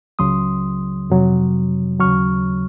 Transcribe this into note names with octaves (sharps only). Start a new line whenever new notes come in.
C#2 C#3 F#3 C6 D#6
F2 C3 F#3
D#2 C#3 F#3 C#6 F6